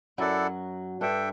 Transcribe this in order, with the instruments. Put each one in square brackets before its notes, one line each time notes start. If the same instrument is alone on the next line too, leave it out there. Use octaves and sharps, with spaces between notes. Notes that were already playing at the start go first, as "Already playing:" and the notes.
[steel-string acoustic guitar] F#2 F#3 [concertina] E4 A4 D5 F#5
[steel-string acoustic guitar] G2 [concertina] D4 A4 E5 G5